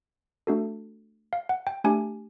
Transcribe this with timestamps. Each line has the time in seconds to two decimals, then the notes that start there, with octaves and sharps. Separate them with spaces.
0.47 A3 D4 F#4 A4
1.33 F5
1.49 F#5
1.67 G5
1.84 A3 D4 G4 G#5